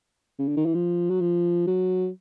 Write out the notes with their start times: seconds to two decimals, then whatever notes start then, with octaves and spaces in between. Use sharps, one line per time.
0.39 C#3
0.48 D3
0.57 D#3
0.66 E3
0.75 F3
1.10 F#3
1.21 F3
1.67 F#3